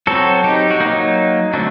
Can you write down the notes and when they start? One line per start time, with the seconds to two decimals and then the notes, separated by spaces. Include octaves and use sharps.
0.07 F#3 C4 F#4 A4
0.44 D#4 G4
0.71 F#4
0.80 F#3 A#3 D#4
1.53 D3 F#3 A3 C4 D4 F#4